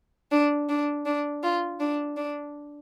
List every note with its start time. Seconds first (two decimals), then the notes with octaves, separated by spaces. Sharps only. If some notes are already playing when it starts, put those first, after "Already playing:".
0.32 D4
0.69 D4
1.06 D4
1.43 F4
1.80 D4
2.17 D4